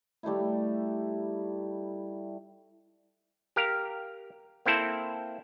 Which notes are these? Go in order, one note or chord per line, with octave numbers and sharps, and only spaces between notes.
G3 A3 D#4 E4
G4 A#4 F5
A#3 C4 E4 A4 C5